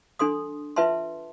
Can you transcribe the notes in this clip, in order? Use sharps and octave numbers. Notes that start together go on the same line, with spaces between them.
D4 A4 C6 D#6
F4 B4 E5 A5 C6